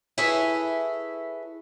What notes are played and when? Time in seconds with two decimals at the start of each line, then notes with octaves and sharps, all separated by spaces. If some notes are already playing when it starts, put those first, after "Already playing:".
0.18 E4 G#4 A4 B4 C#5 E5